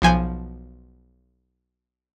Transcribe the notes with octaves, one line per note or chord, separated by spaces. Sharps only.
B1 F3 G#5 G6